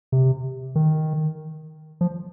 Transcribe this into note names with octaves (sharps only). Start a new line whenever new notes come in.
C3
D#3
F3